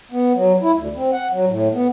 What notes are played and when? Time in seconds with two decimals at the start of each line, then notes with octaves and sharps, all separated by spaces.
0.12 B3
0.35 F#3
0.62 E4
0.75 D2
0.96 C4
1.12 F#5
1.32 F#3
1.48 A2
1.73 B3